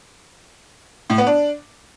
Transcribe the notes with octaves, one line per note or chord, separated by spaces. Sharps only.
A2
B3
D4